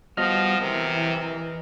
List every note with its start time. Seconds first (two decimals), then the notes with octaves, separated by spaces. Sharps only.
0.17 F3 G3 B3 F#4 D#5 F6
0.61 C3 E3 A#4